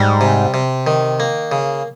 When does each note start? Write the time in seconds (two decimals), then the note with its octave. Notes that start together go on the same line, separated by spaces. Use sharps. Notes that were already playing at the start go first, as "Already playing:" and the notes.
Already playing: G#2 G3
0.21 C3
0.54 C3
0.87 D#3
1.20 A#3
1.52 C#3